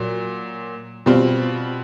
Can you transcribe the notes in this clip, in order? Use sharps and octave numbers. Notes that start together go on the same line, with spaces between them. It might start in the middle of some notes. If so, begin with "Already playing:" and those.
Already playing: A#2 F#3
B2 G3 C4 F4